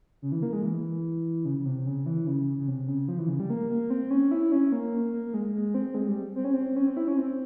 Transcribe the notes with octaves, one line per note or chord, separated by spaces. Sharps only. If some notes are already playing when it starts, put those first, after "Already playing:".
C#3
E3
A#3
G#3
E3
C#3
C#3
C3
C#3
E3
C#3
C#3
C3
C#3
F3
E3
C#3
G3
A#3
A#3
C4
C#4
E4
C#4
A#3
A#3
A#3
G#3
G#3
C4
G#3
G3
C4
C#4
C4
C#4
C4
E4
C#4
C4